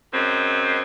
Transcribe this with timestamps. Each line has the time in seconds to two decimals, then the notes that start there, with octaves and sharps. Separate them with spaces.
0.14 F#2 G#3 C4